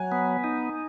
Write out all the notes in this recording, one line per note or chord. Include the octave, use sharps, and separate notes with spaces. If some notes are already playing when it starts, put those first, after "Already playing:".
Already playing: F#3 G#5
B3
D#4